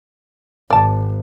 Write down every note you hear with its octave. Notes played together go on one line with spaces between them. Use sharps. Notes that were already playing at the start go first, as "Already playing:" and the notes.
G#1 D5 A5